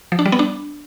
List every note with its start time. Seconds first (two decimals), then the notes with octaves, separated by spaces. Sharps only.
0.12 F3
0.19 D4
0.26 G3
0.32 B3
0.39 D4